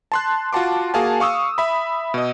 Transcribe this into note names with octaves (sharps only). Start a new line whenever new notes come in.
A5 C6 F#6
F4 F#4 F#5 A5 C6 D6
A#3 F#4 G#4 F5 G#5 A5
F5 C#6 D#6 E6
E5 B5
B2 D#5